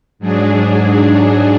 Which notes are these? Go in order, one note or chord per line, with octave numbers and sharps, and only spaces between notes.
G#2 F#3 D4 G#4